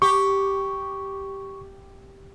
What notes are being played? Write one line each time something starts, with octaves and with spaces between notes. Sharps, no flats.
G4 C#6